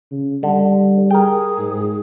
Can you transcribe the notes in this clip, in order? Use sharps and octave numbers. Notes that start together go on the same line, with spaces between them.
C#3
D3 G3
G#4 A#4 G5
G#2